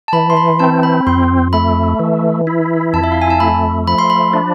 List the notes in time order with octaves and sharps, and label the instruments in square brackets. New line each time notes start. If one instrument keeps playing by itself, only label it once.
[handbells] A5
[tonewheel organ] E3 [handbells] B5
[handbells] C6
B5
[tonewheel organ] C4 [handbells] A5
[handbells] B5
[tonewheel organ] F2 [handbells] C6
[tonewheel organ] A3 [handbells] B5
[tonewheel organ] E3
E4
[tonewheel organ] F2 [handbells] A5
[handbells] E5
F5
G#5
A5
[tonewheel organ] A3 [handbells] B5
[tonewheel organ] F3 [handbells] B5
[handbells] C6
B5
[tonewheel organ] D4